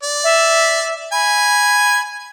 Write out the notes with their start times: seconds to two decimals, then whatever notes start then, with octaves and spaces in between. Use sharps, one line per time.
0.03 D5
0.24 E5
1.12 G#5 B5